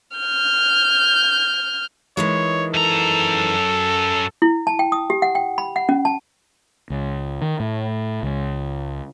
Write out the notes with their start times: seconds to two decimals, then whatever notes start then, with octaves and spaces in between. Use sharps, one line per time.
0.17 F6 G6
2.17 D#3 E3 G#3 C#5
2.74 F#2 A4 A#5
4.42 E4
4.67 A5
4.79 G5
4.92 D#6
5.10 G4
5.22 F#5
5.35 G5
5.58 B5
5.76 F#5
5.89 C#4
6.05 A5
6.90 C#2
7.42 D#3
7.60 A2
8.23 C#2